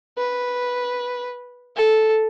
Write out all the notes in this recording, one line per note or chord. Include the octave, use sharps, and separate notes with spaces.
B4
A4